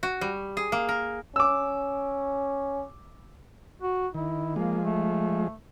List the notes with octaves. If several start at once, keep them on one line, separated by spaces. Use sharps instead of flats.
F#4
G3
G#4
A#3
A#4
C#4 D6 E6
F#4
D#3 E4
F3 G#3 A#3
A3